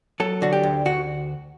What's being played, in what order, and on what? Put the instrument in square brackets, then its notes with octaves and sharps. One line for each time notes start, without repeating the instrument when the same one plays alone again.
[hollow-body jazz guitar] F#3 A4
D3 F#4
G4
D2
D2 F#4